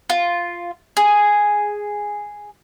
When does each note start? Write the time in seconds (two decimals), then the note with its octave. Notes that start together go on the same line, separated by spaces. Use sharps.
0.10 F4
0.97 G#4